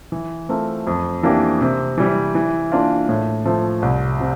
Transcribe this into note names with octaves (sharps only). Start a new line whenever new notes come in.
E3
A3 C4 F4 A#4
F2
E3 A#3 D4 G4
C3
E3 G3
E3
A#3 D4 F4
A2
F3 A3
C2
C3